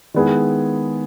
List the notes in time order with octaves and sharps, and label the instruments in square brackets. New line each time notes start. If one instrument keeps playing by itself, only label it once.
[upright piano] D#3 G#3 B3 E4 G#4